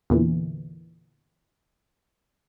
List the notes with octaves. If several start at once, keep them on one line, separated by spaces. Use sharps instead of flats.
E2 A#2 D3 E3